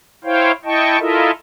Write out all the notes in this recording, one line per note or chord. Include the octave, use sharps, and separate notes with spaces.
E4 C5 C#5 F5 G5
E4 D#5 G5 A5 C#6
E4 F4 A4 A#4 D#5 E5